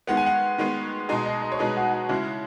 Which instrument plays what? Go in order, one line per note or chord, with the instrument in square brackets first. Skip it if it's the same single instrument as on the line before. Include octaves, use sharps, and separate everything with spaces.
[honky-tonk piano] D#3 G#3 B3 [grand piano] F#5
[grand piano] G#5
F#5
[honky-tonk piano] D#3 G#3 B3
B2 G#3 D#4 G#4
[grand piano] D#5
D#5
C#5
[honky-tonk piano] B2 G#3 D#4 G#4 [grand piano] B4
[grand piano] F#4
F#4
[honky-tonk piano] C#3 G#3 C#4 F#4 [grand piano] E4